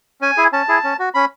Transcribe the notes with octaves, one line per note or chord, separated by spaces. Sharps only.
C#4 G#5
E4 G#4
C#4 A5
E4 G#4
C#4
F#4
C#4 B5